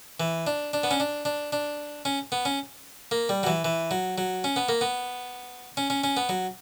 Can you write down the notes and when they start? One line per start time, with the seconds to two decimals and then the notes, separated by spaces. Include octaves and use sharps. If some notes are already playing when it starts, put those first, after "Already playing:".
0.20 E3
0.47 D4
0.73 D4
0.83 B3
0.91 C#4
1.00 D4
1.25 D4
1.52 D4
2.05 C#4
2.32 B3
2.45 C#4
3.11 A#3
3.29 G3
3.43 F#3
3.47 E3
3.65 E3
3.91 F#3
4.18 F#3
4.44 C#4
4.56 B3
4.69 A#3
4.81 B3
5.77 C#4
5.90 C#4
6.04 C#4
6.17 B3
6.29 F#3